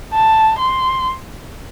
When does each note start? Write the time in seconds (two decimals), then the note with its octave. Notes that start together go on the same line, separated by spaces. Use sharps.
0.14 A5
0.58 C6